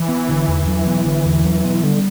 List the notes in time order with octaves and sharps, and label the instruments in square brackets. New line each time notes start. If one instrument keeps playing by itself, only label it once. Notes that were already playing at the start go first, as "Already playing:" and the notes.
Already playing: [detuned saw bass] E3
[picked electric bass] B3
D3
E2
F#3
B3
D3
E2
F#3
B3
[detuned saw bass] D3 [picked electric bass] G3